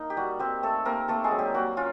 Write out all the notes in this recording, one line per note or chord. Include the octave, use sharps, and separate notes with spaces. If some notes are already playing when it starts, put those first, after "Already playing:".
Already playing: A#3 D#4
G4
G3 F#4
G3 C4 G4
A3 C4 A4
A#3 C4 A#4
A3 A#3 A4
G#3 G#4
F#3
G3 G4
A#3 F#4
C#4 F4